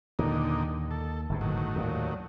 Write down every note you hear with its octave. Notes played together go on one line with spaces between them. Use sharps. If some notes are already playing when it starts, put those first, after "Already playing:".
D#2 A#2 D3 D#3 D#4
A4
G1 G#2 B2
A2 D#3 F#3
D#2 A#2